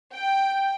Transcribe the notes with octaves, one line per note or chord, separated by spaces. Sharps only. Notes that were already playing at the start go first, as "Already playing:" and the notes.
G5